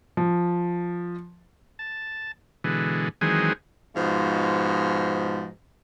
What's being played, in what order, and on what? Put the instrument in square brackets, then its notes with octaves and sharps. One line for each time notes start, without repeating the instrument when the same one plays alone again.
[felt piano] F3
[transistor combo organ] A5
B2 D3 E3 G#3
D#3 E3 F#3 G#3 C4 G#4
[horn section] G#2 B2 F3